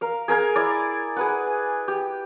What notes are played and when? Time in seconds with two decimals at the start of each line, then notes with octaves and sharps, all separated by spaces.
0.01 A#4 F5
0.28 G#4 A#4 F5 G#5
0.56 E4 D5
1.16 G#4 B4 F#5
1.88 G4